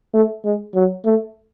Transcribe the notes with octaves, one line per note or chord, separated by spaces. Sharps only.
A3
G#3
F#3
A3